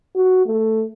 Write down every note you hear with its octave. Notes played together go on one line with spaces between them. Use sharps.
F#4
A3